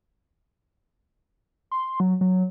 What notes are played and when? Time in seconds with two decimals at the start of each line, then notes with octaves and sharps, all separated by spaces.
1.71 C6
2.00 F#3
2.21 F#3